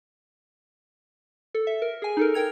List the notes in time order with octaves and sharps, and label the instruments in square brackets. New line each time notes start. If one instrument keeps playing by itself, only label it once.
[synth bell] A4
E5
A#4
G#4 G#5
D#4 A4 A#4
A#4 G5 G#6 F7